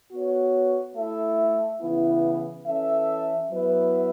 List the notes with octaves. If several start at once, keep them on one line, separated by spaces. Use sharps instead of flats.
B3 F#4 C#5
A3 E4 A4 E5
C#3 E3 B3 E4
E3 C#4 A4 E5
F#3 B3 E4 B4 E5